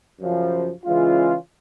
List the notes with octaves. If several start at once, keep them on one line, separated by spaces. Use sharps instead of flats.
F#2 C#3 F3
C#3 E3 G#3 C#4 F4